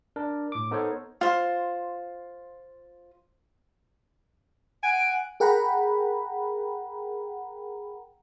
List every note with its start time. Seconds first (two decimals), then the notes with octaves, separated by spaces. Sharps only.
0.16 D4 A#4
0.52 A2 D6
0.71 B3 D#4 A4 A#4 C5 C#5
1.21 F4 C5
4.83 F#5 G#5 D7
5.40 G#4 A#4 F#5 G5 A#5 B5